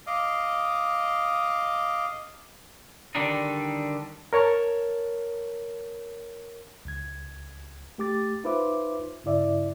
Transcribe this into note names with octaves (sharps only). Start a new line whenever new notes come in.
D#5 F5 D6
D3 D#3 G3 D4 D#4
A#4 C#5 A5
C#2 G#6
A3 G4 D6 A6
D#4 F4 B4 C5 E5 D6
G2 C#3 E4 D5 E5